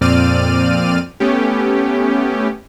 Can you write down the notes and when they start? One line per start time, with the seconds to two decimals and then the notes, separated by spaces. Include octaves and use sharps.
0.01 F2 A#2 C4 D5 F6 D#7
1.20 A3 B3 C#4 G4